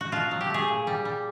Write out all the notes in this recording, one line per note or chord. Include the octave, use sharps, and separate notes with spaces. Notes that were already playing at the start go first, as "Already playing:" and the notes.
F#4
B2 F4
F#3
G4
A3 G#4
A#2
G3
G3